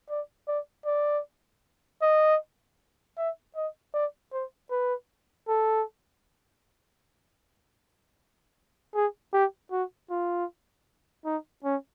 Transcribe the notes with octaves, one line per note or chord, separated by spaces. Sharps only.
D5
D5
D5
D#5
E5
D#5
D5
C5
B4
A4
G#4
G4
F#4
F4
D#4
C#4